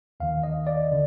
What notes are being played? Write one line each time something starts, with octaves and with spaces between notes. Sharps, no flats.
D#2 D#3 F5
D#5
D5
D3